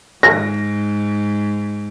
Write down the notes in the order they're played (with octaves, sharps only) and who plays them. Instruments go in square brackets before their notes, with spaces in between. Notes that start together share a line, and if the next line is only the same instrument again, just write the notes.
[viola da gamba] G#2 [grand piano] A#6